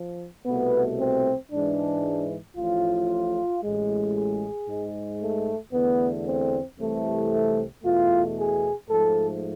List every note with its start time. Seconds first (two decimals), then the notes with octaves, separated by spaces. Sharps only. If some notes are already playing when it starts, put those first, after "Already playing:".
Already playing: F3
0.46 C2 B2 A3 B3
0.98 C4
1.51 G#2 E3 G#3 D4
2.56 A1 A2 F3 F4
3.63 A1 A2 G#3
4.15 G#4
4.67 G#2 G#3
5.20 A3
5.73 E2 D3 A3 B3
6.26 C4
6.78 C2 C3 E3 A3
7.84 E2 B2 A3 F4
8.37 G#4
8.89 G#2 F3 A3 A4